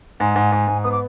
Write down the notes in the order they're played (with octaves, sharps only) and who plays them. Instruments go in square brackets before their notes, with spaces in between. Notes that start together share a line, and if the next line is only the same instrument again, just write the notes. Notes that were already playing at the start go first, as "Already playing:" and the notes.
[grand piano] G#2 [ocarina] G#5
[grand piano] G#2
G#2
G#2
[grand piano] B3 [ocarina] D#6
[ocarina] D6